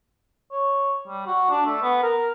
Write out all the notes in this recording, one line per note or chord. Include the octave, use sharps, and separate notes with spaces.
C#5
G3
F#4
D4
A3
B3
A#4